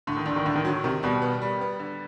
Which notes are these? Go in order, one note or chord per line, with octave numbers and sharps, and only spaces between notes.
A2 D3
D#3
A#1 D3
D#3
A2 D3
D#3
D3 F#3
C3 D#3
B2 G3
B3
G3
B3
D3